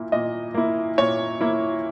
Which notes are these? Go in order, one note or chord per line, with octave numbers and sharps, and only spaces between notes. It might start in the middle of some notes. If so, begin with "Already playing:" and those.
Already playing: A#2 A#3 E4
A#2 D#5
A#3 E4
A#2 C#5
A#3 E4